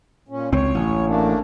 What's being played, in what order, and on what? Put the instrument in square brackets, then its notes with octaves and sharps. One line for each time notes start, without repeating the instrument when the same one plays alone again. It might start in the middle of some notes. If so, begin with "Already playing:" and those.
[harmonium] A#2 C#4
[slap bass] C#2 C4 [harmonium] C#5
[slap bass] A1
[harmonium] A3 A#3 D4